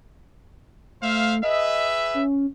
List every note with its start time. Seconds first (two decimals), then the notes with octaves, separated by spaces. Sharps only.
1.02 A3 C5 E5 F5
1.43 G#4 B4 D#5 E5
2.14 C#4